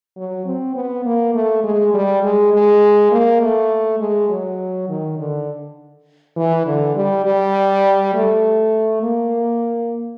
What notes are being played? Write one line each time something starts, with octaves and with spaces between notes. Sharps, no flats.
F#3
C4
B3
A#3
A3
G#3
G3
G#3
G#3
A#3
A3
G#3
F#3
D#3
D3
E3
D3
G3
G3
A3
A#3